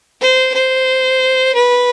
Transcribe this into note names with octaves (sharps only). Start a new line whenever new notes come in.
C5
C5
B4